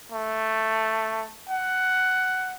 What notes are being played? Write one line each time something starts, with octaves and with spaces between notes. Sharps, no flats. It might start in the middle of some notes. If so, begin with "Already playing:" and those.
A3
F#5